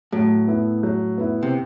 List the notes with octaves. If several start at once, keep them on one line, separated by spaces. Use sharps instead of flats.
A2 F#3
B3 E4
F#3
B3 E4
C3